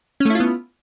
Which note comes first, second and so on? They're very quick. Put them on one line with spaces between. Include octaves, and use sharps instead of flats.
C#4 A3 E4 F4 B3